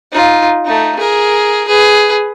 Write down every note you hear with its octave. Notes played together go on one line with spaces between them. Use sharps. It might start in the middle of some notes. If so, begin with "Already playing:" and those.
D#4 F4
A3 D#4
G#4 A#4
G#4 B4